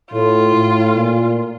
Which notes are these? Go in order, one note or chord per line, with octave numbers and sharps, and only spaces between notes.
A2 F4
A2
A#2